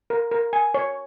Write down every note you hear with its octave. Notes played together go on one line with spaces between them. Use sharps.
A#4
A#4
G#5
C#5